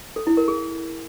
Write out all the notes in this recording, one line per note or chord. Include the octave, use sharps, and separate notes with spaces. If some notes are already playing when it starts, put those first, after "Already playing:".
A4
E4
A#4
G#4